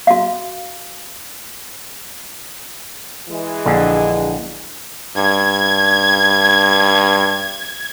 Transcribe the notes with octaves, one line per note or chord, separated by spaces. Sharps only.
F#4 F5
E3 G#3
A#1 D3
G2 G#6